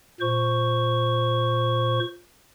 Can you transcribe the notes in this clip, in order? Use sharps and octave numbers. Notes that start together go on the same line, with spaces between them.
A#2 C5 C#6